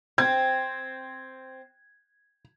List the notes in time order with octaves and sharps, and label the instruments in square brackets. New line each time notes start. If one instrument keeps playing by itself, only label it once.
[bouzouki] C4 [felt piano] G#6